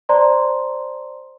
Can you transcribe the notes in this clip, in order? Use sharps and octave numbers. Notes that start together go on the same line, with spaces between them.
C5 D5 A5 A#5 C6